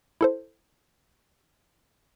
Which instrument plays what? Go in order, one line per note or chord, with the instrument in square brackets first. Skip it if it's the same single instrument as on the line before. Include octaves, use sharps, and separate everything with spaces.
[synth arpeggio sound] E4 A4 C5